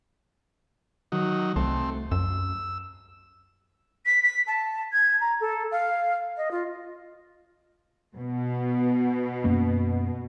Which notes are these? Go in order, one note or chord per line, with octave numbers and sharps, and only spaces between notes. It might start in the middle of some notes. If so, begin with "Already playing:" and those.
D#3 F#3
C2 A3 C4
F#2 E6
B6
B6
A5
G#6
A#5
A4
F5
D#5
F4
B2
F#2 A#3 C#4